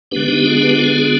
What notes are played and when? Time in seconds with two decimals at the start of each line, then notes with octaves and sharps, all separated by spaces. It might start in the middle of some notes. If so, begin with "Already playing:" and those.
0.11 D3 G#3 B3 D4 G4 B4
0.28 D#4 G4
0.45 F4 G#4
0.62 G4 B4
0.79 F4 G#4
0.95 F4 G#4